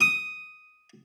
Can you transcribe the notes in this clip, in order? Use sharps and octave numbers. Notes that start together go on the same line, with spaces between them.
D#6